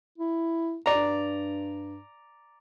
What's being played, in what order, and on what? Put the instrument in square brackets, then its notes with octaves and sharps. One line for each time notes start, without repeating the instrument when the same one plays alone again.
[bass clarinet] E4
[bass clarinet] G2 [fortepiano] D5 A#5